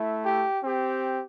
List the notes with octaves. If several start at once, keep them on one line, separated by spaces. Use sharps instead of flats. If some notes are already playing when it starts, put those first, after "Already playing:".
Already playing: A3 E4
G4
C4 G4